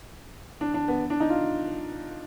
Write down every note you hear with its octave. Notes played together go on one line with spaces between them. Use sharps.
D4
D4
B3
D4
D#4
F4